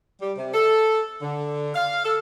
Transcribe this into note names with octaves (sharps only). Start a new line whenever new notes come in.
G3
C3
A4
D3
F5
A4